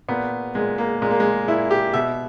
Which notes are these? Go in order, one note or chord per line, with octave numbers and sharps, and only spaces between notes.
A#2 B3
A#2 G#3
A#3
A#2 G#3
A#3
G#3
A#2 E4
G4
B2 E5